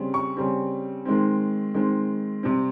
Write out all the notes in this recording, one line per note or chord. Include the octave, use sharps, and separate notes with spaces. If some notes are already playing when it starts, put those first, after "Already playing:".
Already playing: C#3 G3 C4
C#6
C#3 G3 C4
D#3 G#3 C4
D#3 G#3 C4
C3 G3 C4